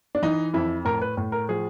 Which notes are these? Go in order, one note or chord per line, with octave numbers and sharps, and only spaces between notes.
D4
E3 D#4
F2 E4
A2 A#4
B4
A2
A#4
F3 G#4